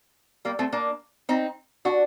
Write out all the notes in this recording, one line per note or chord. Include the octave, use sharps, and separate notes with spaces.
G3 A#3
A3 C4
A#3 D4
C4 D#4
D4 F#4